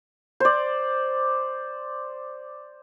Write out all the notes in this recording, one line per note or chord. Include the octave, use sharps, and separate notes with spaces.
C5 D5